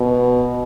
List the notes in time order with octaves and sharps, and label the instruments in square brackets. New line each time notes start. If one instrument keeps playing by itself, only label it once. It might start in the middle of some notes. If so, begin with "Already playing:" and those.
Already playing: [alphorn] B2